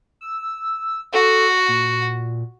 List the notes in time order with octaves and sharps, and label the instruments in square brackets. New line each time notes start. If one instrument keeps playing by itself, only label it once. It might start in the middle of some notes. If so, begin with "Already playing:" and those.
[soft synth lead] E6
[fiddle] F#4 [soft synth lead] A4
[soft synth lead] A#2